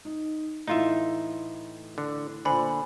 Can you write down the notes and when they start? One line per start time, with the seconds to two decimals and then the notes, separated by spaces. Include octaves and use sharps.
0.05 D#4
0.68 A2 E3 D#4 F4 E5
1.98 D3
2.45 A#2 D3 C5 G#5 B5